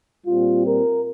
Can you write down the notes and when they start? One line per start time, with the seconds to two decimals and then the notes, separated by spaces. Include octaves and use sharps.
0.25 A#2 G3 C4 F4
0.65 A#4